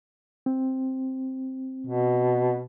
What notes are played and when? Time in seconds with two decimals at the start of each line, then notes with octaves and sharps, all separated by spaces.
0.46 C4
1.87 B2